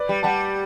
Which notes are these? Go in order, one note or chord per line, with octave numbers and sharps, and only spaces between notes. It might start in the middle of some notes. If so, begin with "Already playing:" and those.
Already playing: B4 D5
G3
G3 F#5 A5